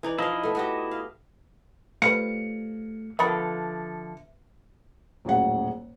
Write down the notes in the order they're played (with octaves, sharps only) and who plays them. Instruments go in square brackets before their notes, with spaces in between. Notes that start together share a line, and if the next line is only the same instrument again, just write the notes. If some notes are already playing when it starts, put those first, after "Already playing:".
[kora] E3 D#4 D5
[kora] F3 F5 [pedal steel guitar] E4 D#5
[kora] A3 B3
B3 F#4 G4
F5
[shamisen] F3 G3 B4 [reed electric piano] A3 [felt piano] C#7
[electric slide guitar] D3 F3 A4 [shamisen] B3 A#4 B5 [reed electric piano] E5
[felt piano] D#1 F#2 A2 G#3 F#5